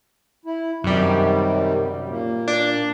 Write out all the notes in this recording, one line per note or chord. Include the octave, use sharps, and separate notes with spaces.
E4
F#2 C3 D#3 G3
A#2 A#3
D4